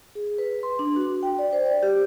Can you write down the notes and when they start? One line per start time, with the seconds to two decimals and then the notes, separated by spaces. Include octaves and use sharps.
0.15 G#4
0.38 B4
0.63 C6
0.79 D4
0.96 F#4
1.23 G5
1.39 D5
1.53 C5
1.66 D5
1.83 G4